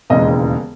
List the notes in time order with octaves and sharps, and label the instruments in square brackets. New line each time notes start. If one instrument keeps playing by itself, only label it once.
[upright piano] E1 D#2 C#3 E3 G#3 D#5